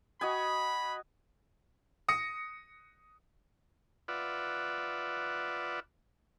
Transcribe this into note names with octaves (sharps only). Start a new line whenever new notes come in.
F#4 D#5 G#5 B5
D#6 A#6 C#7
F4 B4 D5 E5 F#5